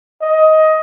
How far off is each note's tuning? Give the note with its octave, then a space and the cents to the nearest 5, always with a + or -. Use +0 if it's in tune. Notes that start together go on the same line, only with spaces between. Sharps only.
D#5 +15